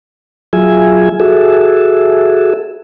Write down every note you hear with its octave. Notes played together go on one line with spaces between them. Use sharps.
F#3 F4 G#4 E5 G#5
F#4 G#4 A4 E5